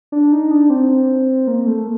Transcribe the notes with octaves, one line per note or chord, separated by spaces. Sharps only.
D4
D#4
D4
C4
A#3
A3